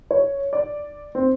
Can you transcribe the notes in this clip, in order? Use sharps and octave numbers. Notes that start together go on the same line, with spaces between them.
C#5
D5
C4